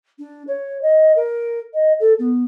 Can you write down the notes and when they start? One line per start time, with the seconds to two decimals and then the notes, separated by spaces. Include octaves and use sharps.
0.18 D4
0.47 C#5
0.82 D#5
1.16 A#4
1.73 D#5
2.00 A4
2.19 B3